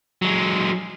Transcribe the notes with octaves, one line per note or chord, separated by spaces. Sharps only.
F#3 G#3